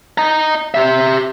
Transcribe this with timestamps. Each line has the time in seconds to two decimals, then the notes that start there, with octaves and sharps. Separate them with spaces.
0.18 D#5 A#5
0.75 G4 E5